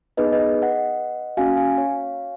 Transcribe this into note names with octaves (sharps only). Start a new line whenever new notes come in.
B3 D#4 G#4 B4 D#5
B4 D#5
D#5 F#5
A#3 C#4 F#4 F5 G#5
F5 G#5
C#5 F5